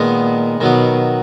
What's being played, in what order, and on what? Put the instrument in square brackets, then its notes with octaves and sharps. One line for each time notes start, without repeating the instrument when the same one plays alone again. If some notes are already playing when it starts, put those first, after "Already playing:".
Already playing: [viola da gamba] A#2 [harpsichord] D#3 G#3 B3
[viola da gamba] B2 [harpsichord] D#3 F#3 B3